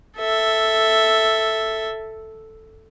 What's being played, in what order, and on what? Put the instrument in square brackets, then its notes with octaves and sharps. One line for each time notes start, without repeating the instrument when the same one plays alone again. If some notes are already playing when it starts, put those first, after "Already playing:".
[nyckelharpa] A4 E5